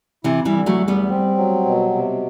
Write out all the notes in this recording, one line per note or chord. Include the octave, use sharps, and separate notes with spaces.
C3 E3 E4
E3 G3
D3
F#3 A3
E2
G3 B3
C4
F#3
B2
C3